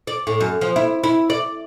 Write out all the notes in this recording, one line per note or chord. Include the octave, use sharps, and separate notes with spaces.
D5
A2
F#2
F3
E4
E4
D5